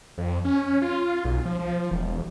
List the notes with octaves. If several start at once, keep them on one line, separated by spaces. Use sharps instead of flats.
F2
C#4
F4
B1
F3
F3
E1